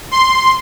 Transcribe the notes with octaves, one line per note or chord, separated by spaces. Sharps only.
C6